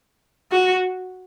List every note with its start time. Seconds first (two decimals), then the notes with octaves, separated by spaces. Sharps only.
0.52 F#4